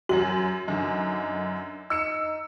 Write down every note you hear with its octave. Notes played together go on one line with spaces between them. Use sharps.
F#2 F#3 F#4 F#7
F#2 D3 D#4
D#4 E6 C#7 E7